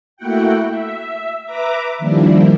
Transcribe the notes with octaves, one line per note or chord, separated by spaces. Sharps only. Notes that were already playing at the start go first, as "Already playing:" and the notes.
A3 A#3 E4 F#4 F#5 G5
E5
B4 E5 A#5 D6
D#3 F3 G3 A#3 D4 E4